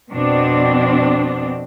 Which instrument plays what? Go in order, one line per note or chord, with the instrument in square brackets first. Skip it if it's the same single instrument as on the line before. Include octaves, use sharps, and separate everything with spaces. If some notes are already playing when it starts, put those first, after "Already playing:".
[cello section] F2 B2 C4 D4